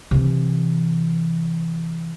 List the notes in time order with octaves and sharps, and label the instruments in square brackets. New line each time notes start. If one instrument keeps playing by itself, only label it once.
[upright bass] C3 E3